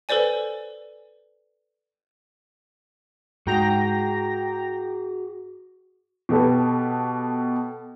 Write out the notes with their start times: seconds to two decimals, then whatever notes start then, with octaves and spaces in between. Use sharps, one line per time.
0.09 A4 B4 C5 D5 G#5
3.47 G#2 F#4 G#4 F#5 G5 A#5 A#6
6.29 B2 G4 A4 B4